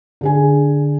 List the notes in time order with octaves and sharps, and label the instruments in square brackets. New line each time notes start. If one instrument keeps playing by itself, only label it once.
[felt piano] D3 G#4 G#5